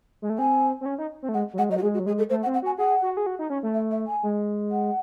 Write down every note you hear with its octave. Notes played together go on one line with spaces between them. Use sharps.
G#3
A3
C4 G#5
C4
C#4
D#4
C4
A3
G#3 F#5
F#3
G#3 F#5
F#3 D#5
F#4
G#3 G#4
F#4
F#3
G#3 G#4
A4
A3 C5
F#5
C4
F#5
F#4 G#5
G#4 F#5
F#4
G#4
F#4
D#4
C#4
A3
E5
E5
G#5
G#3
F#5